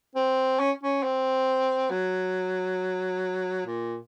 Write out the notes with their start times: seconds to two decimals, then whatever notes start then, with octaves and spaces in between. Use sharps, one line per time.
0.15 C4
0.59 C#4
0.83 C#4
1.03 C4
1.90 F#3
3.66 A#2